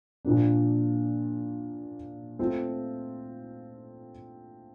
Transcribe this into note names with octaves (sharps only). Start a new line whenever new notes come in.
A#2 F3 A#3 D4
A3 C4 F4